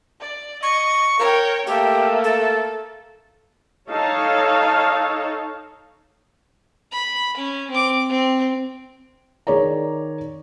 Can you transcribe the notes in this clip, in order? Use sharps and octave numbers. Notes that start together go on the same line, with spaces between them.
D5
D#5 C#6
A#4 C#5 G5
A3 A#3 G4
A4
D#4 A4 C#5 F5
B5
C#4
C4 D6
C4
D#3 G#4 C#5 D5 A#5